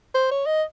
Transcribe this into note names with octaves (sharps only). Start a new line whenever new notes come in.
C5
C#5
D#5